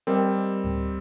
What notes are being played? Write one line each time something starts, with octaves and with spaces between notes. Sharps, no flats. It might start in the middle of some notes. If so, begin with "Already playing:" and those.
G3 C4 A#4 D#5 G5
D2 A2